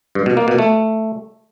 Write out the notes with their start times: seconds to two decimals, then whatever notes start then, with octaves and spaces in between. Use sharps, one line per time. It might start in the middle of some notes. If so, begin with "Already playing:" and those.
0.15 G2
0.26 B2
0.37 A#3
0.48 B2
0.59 A3